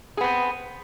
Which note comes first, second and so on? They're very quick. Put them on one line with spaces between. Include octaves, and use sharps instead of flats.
G#4 B3 C4